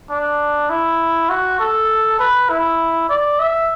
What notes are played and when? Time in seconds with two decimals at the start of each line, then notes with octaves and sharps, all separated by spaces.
0.10 D4
0.70 E4
1.29 F#4
1.60 A4
2.19 B4
2.50 E4
3.09 D5
3.39 E5